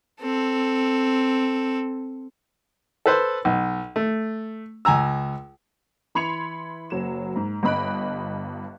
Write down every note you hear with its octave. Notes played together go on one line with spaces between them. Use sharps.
C4 A4
A4 B4 C5
B1
A3
C#2 G#5 A#5 E6
E3 B5 C6 G#6 C#7 F7
F#1 F#3 E7
G#2
G1 G2 D#5 B5 F#6 D7